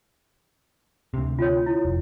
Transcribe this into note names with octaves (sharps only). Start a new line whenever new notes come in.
D2 C3
F4 C#5
E4
F1